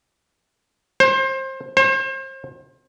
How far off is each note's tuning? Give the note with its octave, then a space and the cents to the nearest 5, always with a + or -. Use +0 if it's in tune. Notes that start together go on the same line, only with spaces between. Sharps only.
C5 +25
C5 +35